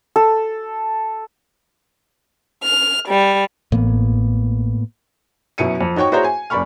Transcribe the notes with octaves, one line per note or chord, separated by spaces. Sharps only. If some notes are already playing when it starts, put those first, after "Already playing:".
A4
F6
G3
A1 A2 A#3 B3
F#2 B2 E4 C#7 D#7
F2
D#4 F#4 C#5 G5 C#6
E4 F#4 G#4 C5 C#5 A#5
G#5
F#1 D5 B5 C#6 F6